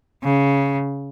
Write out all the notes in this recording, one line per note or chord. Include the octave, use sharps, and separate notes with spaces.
C#3